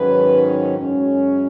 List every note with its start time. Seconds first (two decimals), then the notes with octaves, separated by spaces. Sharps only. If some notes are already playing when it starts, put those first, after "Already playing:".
Already playing: G#2 D#3 F#3 C#4 B4
0.77 F#2 C#3 G#3 C#4